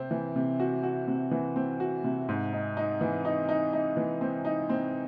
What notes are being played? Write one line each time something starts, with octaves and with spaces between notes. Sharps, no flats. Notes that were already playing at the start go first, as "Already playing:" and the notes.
Already playing: C3 C4
E3
C3
F#4
F#4
C3
E3
C4
F#4
C3
G#2
D#4
D#4
E3
D#4
D#4
D#4
E3
C4
D#4
C4